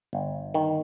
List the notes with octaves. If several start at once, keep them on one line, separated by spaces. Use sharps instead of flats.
G1
D#3